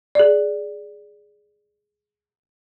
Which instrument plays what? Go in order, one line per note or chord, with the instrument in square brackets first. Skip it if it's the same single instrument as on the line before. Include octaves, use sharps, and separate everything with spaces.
[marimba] G#4 D5